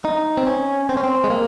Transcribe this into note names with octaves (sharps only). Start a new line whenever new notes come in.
D#4
C4
C#4
C4
C#4
C4
G#3
A#3